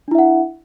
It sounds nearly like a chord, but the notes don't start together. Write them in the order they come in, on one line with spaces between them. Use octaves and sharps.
D4 E4 E5 F#5